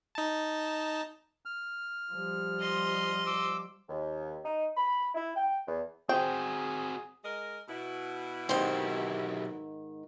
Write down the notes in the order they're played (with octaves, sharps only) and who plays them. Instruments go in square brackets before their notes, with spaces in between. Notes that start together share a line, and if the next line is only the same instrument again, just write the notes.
[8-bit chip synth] D#4 A5
[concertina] F6
[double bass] F3 G3
[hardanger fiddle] D#5 C6
[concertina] D6 E6
[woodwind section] D#2
D#4
B5
E4
G5
E2
[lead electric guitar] C4 F#4 [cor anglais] G#4 [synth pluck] C5 [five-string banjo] G5
[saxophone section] G#3 A#4 D#5
B2 E4
[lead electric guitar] B1 G4 [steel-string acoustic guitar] G#2 D#3 [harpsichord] C4 C5